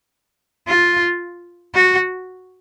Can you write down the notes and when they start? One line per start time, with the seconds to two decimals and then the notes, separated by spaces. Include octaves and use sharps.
0.68 F4
1.75 F#4